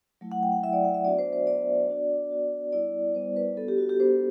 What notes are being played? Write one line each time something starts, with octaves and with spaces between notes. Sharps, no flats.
F#3 A3 E4
F#5
G5
F#5
F#3 A3 E4 E5
D5
F#5
E5
B3 D4 F#4 D5
C5
C5
B3 D4 F#4 D5
B3 D4 F#4
B3 D4 F#4
G3 B3 E4 D5
G3 B3 E4 C5
B4
B3 D4 F#4 A4
G4
F#4
G4
B3 D4 F#4 C5